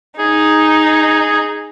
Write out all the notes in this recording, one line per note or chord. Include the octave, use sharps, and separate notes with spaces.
D#4 G#4